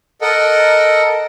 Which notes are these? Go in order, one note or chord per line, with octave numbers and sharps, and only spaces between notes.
A4 A#4 D#5 F#5